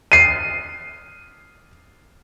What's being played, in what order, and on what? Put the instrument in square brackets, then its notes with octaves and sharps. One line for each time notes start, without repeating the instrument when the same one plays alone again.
[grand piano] C7 D#7